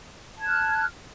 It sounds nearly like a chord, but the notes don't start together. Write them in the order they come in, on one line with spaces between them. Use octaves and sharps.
A5 G#6 F#6 F6